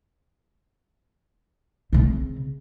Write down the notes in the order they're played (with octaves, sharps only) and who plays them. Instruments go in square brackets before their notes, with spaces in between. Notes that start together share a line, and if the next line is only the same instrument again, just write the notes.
[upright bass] C#3 C4